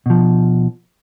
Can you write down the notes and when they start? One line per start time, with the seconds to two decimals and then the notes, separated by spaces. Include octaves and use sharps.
0.06 B2 F3